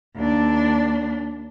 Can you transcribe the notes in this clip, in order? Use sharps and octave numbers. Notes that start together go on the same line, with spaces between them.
D#2 D4